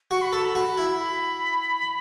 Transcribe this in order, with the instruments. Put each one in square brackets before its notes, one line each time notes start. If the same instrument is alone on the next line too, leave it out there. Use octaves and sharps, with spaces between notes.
[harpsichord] F#4 [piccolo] C#6
[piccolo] B5
[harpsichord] A4 [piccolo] A5
[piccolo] B5
[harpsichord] F#4
E4
[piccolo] B5